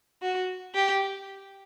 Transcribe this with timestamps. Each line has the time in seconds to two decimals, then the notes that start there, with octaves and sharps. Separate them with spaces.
0.22 F#4
0.74 G4